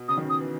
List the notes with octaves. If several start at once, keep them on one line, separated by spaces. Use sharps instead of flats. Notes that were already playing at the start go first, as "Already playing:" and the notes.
Already playing: B2
C#3 D#6
D#3
C#3
D#6
E3